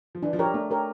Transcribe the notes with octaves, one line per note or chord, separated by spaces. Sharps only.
F3
E3 D4
F3
G3 G4 A#4 C#5
A3 D4
G4 A#4 C#5